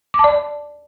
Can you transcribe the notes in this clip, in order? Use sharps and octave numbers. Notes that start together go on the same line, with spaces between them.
D6
A5
D5